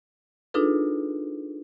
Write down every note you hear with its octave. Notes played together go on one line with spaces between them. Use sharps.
D4 D#4 F4 G#4 A4 B4